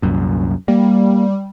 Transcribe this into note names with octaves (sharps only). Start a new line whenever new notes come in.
C2 F#2 A#2
G3 A#3